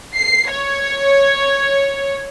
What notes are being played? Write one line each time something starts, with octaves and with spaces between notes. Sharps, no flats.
C7
C#5